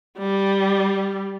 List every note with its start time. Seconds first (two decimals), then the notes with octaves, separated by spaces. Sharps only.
0.19 G3